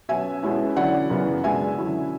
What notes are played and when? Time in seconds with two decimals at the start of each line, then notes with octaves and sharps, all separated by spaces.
0.09 B2 F#3 C#4 E5 G#5
0.43 B2 G#3 C#4 E4
0.76 D3 F#3 C#4 E4 D5 F#5
1.10 F#2 C#3 E3 B3
1.44 B2 G#3 D4 E5 G#5
1.78 D3 F#3 C#4 E4